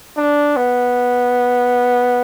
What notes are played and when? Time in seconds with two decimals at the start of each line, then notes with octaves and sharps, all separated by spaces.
0.17 D4
0.56 B3